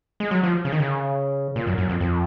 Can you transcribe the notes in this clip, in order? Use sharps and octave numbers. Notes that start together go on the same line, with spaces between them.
G#3
F#3
F3
C#3
D#3
C#3
A#2
F#2
F#2
F2
F2